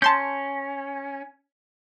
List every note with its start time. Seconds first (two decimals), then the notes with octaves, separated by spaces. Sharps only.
0.02 C#4 A5 C6 G6